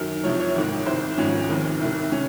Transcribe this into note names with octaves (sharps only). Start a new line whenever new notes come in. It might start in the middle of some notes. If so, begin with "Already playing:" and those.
Already playing: F#2 D#3
C2 C3 F3 C#5
C#5
G#1 G#2 D#3
C2 C3 D#3 C5
G#1 G#2 F3 C#4
F1 D#2 D#3 C4
C2 C3 D#3
D#3 C#4